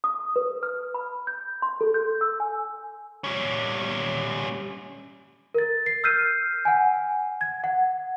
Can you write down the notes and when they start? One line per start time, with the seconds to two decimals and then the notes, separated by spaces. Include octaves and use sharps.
0.04 D#6
0.36 B4
0.63 F6
0.94 B5
1.27 G6
1.62 C6
1.81 A4
1.94 G6
2.21 E6
2.40 G#5
3.24 G3 C#4
5.54 A#4 A6
5.86 C7
6.04 E6 F6 G6 B6 C7 D#7
6.65 F#5 G#5
7.41 G#6
7.64 F#5